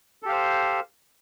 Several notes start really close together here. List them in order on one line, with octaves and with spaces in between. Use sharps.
A4 G4 F5 C5